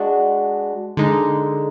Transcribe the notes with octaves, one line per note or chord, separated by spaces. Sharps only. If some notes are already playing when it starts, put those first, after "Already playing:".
Already playing: G#3 D4 F#4
D3 G#3 D#4